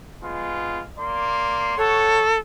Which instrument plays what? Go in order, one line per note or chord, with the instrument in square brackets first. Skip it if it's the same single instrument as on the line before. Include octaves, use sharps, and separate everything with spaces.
[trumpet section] G#3 B3 F4
A#3 D5 C6
[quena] A4 [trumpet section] C#5 F#5 C#6